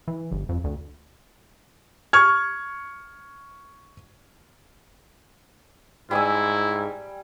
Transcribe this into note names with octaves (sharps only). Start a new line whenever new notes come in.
E3
G1
F2
D2
C#6 F6 G#6
G#2 G3 E4 G#5 E6